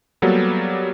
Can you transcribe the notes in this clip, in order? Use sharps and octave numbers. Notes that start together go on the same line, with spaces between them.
F#3 G3 A#3 B3 G4 A4